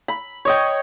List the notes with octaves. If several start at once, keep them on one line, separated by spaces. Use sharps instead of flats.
B5
C#5 D#5 G5